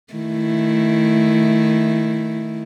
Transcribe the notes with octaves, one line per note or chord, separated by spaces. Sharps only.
D#3 A3 E4